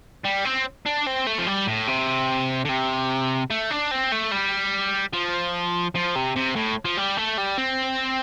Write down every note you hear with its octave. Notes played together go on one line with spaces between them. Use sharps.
G3
C4
D4
C4
A3
F3
G3
A2
C3
D3
C3
A3
D4
C4
A3
G3
F3
F3
C3
C3
A2
F3
G3
A3
G3
C4